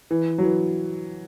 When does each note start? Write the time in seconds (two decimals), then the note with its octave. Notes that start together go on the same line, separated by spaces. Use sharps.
0.11 E3
0.38 F#3
0.43 E3